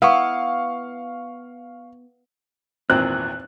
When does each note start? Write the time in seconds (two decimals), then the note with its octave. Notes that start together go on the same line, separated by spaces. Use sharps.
0.02 B3 E4 F5 C#6
2.90 G#1 E2 A#2 C4 F#6